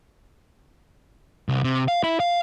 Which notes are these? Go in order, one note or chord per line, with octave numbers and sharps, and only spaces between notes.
C2
C3
F5
E4
F5